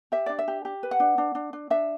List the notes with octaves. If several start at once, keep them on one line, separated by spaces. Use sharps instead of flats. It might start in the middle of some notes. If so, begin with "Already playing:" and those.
G4 E5
D4 D5
E5
G4
G4
B4
F#5
D4
D4
D4
D4
D4 E5